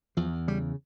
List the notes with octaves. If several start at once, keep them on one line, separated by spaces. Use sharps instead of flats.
E2 F3
C#3 G3